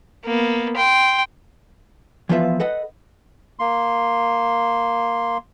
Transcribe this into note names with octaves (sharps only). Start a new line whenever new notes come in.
A#3 B3
G5 C6
E3 F3 B3 F4 B4 E5
A4 B4 D#5 F#5
A#3 C6